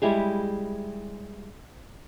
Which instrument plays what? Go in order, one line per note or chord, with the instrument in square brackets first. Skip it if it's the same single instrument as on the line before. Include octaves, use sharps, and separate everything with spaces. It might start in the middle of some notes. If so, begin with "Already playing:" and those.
[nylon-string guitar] G3 G#3 E4 G4 G#4